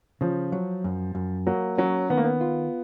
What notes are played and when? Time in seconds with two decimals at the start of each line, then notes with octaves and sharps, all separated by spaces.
0.21 C#3 F3
0.52 F#3
0.84 F#2
1.15 F#2
1.47 F#3 A#3
1.78 F#3 C#4
2.10 D#3 B3
2.17 A#3
2.24 B3
2.41 F4